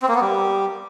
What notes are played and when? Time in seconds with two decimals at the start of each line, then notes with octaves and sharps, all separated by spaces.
0.02 C4
0.09 A#3
0.15 B3
0.21 G3